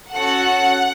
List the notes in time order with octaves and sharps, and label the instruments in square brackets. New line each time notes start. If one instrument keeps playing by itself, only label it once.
[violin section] C#4 F#4 A4 F#5